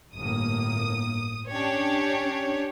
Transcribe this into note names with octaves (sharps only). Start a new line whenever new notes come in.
G1 A2 A#3 D#6
C#4 D4 G4 C#5